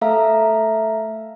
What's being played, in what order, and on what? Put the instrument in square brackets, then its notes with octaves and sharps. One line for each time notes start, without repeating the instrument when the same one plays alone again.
[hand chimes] A3 A4 E5 F5 A#5